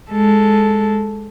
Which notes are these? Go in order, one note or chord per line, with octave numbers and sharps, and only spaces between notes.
G#3 A4